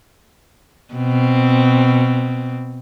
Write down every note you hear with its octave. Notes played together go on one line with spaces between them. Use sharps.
B2 C4